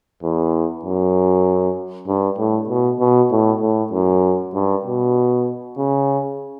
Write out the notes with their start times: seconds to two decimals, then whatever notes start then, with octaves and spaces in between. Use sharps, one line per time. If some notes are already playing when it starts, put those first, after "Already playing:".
0.23 E2
0.85 F#2
2.08 G2
2.38 A2
2.69 B2
3.00 B2
3.31 A2
3.61 A2
3.92 F#2
4.54 G2
4.85 B2
5.77 C#3